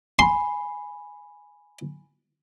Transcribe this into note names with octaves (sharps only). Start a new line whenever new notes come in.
G#5 B5 C6